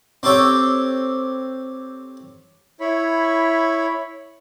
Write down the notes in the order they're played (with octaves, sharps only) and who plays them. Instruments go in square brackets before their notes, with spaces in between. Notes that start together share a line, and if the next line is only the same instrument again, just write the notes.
[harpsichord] C4 G4 A4 C#5 G5
[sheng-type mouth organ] E4 C#5 B5